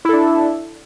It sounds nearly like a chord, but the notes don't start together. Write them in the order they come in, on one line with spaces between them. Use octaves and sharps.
E4 A4 D4